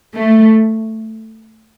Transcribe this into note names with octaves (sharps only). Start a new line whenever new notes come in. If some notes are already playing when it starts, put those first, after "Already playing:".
A3